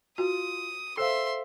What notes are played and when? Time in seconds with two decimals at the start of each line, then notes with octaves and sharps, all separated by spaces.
0.18 F4 F#4 D#6
0.97 A4 C5 E5 F5 C6 E6 C7